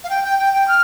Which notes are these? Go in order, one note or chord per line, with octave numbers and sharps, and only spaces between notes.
F5
G5
G5
G5
G5
F6